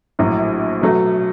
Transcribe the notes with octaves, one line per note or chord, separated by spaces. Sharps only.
A#1 A2 F#3
B2 F#3 A3